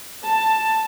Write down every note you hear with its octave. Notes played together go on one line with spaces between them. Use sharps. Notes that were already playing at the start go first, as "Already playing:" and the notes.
A5